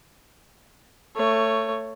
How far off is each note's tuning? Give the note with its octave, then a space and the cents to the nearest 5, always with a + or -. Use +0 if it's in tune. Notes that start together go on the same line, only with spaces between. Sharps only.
A3 +25 C#5 +0